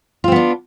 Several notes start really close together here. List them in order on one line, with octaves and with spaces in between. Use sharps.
F4 C4 B3 D4